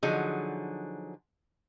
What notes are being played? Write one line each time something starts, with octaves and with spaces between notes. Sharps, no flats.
D3 F3 F#3 D#4 G#4